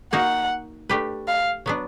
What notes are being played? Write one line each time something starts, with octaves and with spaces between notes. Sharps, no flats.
A#3 D#4 F#4 F#5
A3 D4 G4 B4
F5
F#3 B3 D4